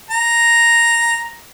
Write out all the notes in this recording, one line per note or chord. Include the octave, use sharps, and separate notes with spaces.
A#5